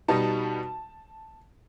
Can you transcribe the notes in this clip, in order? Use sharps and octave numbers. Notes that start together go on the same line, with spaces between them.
B2 G3 B3 D#4 A5